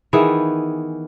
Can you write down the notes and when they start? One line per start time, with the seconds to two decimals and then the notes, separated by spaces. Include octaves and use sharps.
0.13 D#3 E3 B3 G#4